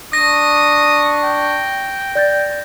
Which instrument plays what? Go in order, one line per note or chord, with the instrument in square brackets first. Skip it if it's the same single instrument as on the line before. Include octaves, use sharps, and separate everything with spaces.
[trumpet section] D4 C#6 [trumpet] D#6 [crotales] A#6
[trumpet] G5
[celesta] D5 G6 A6